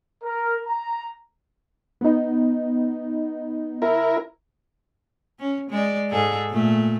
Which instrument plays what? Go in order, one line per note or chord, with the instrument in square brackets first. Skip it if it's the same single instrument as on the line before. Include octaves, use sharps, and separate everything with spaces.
[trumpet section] A#4
A#5
[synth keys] B3 D#4
[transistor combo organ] E4 A#4
[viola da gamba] C#4
G#3 D5
G#2 G#4 A4
A#2 A3